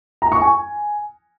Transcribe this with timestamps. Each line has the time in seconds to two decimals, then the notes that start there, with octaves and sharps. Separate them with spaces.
0.22 A#5
0.32 C#6
0.41 G#5